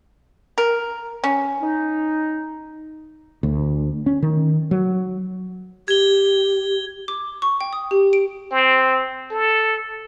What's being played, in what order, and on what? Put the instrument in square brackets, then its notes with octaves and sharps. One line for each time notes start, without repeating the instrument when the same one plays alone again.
[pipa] A#4
C#4
[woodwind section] D#4
[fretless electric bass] D2
C#4
D#3
F#3
[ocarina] G4 [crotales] G#6 G7
[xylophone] D6
C#6
G5
D#6
G4
D7
[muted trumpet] C4
A4